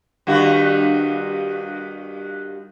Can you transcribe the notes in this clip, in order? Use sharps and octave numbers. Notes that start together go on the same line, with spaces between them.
G2 D#3 F#4